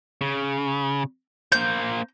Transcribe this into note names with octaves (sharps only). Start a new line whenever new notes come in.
C#3
A#3 C5 G6